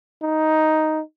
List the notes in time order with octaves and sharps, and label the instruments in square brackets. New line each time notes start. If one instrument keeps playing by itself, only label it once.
[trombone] D#4